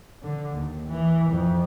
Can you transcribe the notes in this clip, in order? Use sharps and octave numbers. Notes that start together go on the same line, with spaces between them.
D3
D#2
E3
F2